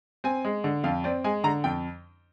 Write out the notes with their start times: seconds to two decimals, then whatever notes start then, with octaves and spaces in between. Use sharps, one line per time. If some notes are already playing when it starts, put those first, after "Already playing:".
0.24 C4 G#5
0.45 G#3
0.64 D3
0.84 F2 F5
1.04 C4 D5
1.24 G#3 G#5
1.44 D3 A#5
1.64 F2 G5